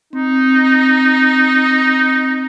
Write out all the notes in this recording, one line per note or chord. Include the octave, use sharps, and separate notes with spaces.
C4 D#4